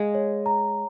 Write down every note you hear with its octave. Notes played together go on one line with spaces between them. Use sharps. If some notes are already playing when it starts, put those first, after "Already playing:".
Already playing: G#3 F5
C#5
A#5